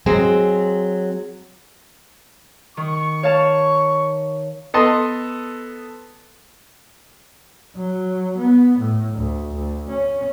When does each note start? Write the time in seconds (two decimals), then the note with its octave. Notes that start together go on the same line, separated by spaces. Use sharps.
0.06 F#3 G#3 C4
2.77 D#3 C#6
3.23 C#5 F5 A5
4.74 B3 A4 D#5 A5 C6
7.76 F#3
8.38 B3
8.79 A2
9.14 D2
9.54 D2
9.90 C#4